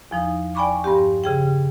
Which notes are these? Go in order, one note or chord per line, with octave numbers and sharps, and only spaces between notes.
E2 F3 D#4
D5 G5 G#5 B5 C#6 D6
G2 F3 C4 G4
C#3 G#4 G5